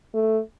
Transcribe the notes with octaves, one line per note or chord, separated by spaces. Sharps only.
A3